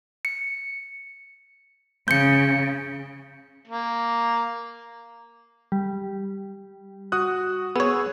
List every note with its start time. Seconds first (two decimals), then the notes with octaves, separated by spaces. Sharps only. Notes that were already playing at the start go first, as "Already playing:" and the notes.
0.25 C#7
2.08 C#3 G6 C#7
3.68 A#3
5.72 G3
7.12 F#4 D#6 F#6
7.76 B3 G#4 C#5 E6